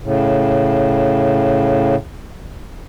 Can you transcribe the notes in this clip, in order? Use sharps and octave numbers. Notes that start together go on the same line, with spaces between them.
A2 C#3